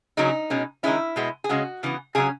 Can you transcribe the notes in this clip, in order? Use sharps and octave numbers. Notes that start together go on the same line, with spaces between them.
C#3 F#3 C#4 D#4
B2 G#3 C#4
D#3 G#3 C#4 E4
B2 G#3 B3
G#4
C#3 G#3 C#4 F#4
C#3 E3 B3
C#3 F#3 C#4 G#4